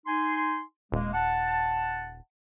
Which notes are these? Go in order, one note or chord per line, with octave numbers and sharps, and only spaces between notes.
D#4 G#5 C6
D#1 G#3 A#3
F#5 A5